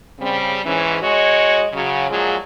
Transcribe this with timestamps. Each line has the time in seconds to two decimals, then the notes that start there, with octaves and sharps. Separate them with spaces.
0.19 C#3 G3 C4
0.64 G#2 E3 C#4
1.01 G#3 F#4 C#5 D#5
1.73 C#3 F#3
2.10 A#2 F3 F#3 G#3 F4 G#4